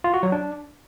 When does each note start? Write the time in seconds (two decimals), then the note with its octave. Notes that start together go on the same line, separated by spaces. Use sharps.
0.04 F4
0.14 F#4
0.23 F#3
0.32 D4